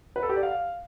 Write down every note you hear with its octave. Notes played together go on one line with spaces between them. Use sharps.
B4
A4
G4
D5
F5